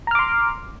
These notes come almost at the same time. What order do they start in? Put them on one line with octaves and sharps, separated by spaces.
A#5 F6 D6 C6